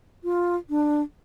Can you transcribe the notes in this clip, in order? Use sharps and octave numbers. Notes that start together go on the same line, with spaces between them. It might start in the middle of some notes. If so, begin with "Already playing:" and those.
F4
D4